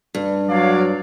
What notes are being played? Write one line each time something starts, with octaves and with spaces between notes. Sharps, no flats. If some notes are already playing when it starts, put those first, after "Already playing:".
G2
F#3 C#5 D5 F5